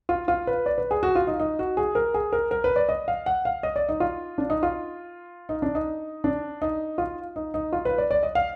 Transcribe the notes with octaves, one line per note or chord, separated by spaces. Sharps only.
F4
F4
B4
D5
B4
G#4
F#4
F4
D#4
D#4
F#4
G#4
A#4
G#4
A#4
A#4
B4
D5
D#5
F5
F#5
F5
D#5
D5
D#4
F4
D4
D#4
F4
D#4
D4
D#4
D4
D#4
F4
D#4
D#4
F4
B4
D5
D5
D#5
F5